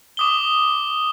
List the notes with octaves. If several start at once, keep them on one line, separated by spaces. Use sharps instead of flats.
D6 D#6 G7